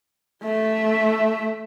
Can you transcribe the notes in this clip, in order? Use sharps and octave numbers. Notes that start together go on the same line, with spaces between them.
A3 E5